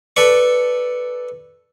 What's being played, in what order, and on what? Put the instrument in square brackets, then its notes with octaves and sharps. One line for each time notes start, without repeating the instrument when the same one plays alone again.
[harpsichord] A4 B4 D5 C#6